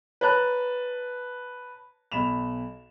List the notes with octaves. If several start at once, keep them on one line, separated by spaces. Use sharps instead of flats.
B4 C#5 A5 A#5 F#6
B1 B5 E7 F7